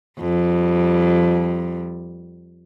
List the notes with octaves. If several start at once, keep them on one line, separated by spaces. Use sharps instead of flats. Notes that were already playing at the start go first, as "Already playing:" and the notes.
F2 G3